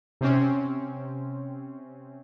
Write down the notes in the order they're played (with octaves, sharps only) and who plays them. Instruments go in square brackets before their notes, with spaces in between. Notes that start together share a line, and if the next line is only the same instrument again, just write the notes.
[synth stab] C3 C4 C#4